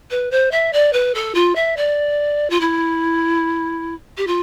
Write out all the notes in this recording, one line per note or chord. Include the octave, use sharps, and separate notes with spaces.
B4
C5
E5
D5
B4
A4
F4
E5
D5
F4
E4
G4
F4